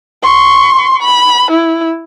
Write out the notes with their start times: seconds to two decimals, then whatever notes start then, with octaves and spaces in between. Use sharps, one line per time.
0.23 C6 C#6
1.02 B5
1.51 E4